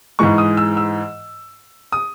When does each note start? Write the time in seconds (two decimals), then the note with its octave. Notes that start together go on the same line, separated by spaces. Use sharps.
0.19 G#2 E3 G#3 C#6
0.38 D#6
0.57 E6
0.77 E6
1.92 D#6